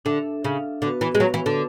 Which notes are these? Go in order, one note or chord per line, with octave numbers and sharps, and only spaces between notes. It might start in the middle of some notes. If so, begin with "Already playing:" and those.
D3 D4 A4 E5
C#3
D3 B3 F#4 B4
E3
G#3
F#3
E3
D3